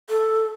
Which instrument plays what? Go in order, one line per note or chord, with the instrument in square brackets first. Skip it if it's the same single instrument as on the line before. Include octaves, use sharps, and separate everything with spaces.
[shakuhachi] A4